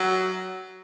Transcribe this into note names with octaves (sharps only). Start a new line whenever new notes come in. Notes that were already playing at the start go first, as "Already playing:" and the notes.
Already playing: F#3